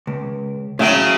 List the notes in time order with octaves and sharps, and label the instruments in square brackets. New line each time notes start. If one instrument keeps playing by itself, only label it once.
[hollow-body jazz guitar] C#2
[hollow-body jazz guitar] A2 E5 G5 [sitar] C#3 F#3